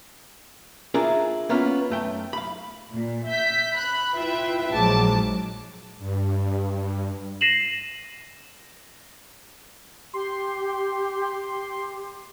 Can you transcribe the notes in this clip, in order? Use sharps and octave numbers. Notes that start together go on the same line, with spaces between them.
D4 E4 F4 G#4 A#4
A#3 B3 C#4 F4
F#2 A3 G5
F5 B5
A#2
E5 G6 B6
B5 F#6
E4 F4 B4 E5 G5
A#1 G#2 F#3 A5 D6
G2
A#6 C7 D#7 E7 F#7
G4 C6